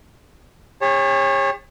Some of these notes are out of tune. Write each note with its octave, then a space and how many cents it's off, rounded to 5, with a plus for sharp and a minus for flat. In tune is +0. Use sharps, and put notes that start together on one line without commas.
G4 +45 C#5 -20 A5 +0